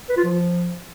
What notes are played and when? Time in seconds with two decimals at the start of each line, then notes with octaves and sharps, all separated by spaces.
0.09 B4
0.17 F4
0.24 F3